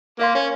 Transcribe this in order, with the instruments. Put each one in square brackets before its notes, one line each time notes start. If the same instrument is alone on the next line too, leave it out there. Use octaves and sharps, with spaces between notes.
[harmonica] A#3 [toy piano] A#4 F5 C6
[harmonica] C#4